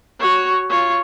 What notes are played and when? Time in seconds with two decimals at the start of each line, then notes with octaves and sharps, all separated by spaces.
0.19 F#4 C#5
0.69 F4 C#5